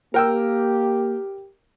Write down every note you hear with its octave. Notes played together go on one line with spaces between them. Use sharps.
A#3 G4 A#4 G5 E6